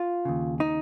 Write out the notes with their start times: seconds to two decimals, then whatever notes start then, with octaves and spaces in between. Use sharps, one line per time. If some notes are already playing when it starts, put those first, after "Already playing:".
Already playing: F4
0.25 D#2 C#3
0.60 D#4